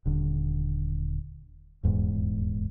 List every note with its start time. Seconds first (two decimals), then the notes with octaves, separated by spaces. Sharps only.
0.05 D#1 D3
1.83 D#1 E2 G#2